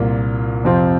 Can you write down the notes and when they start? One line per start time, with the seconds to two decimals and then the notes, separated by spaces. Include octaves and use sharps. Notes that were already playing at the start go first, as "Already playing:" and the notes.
Already playing: C2 A#2 A#3 F4
0.64 F2 C3 F3 C4 F4